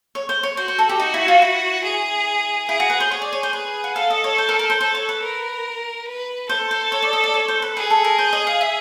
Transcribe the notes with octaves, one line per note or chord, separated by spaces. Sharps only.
C#5
C5
C#5
F#4 C5
C5
A4
G4
D#4 F#4
E4
F4
E4
G#4
E4 G#4
F#4
B4
C5
G#4 C#5
D5
C#5
C5
B4
F#5
A4 F5
D#5
C#5
C5
A#4
A#4
C5
A4 C5
C#5
B4
A#4
B4
A4 C5
C5
C#5
D5
D#5
D5
C#5
C5
B4
G#4 B4
A4
A#4
C5
D#5
F5
E5